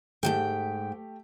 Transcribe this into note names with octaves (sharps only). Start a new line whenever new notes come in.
G#2 F3 A3 G4 G5